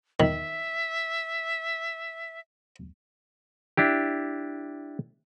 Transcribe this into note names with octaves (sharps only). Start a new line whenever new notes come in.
D#3 E5
D4 E4 G4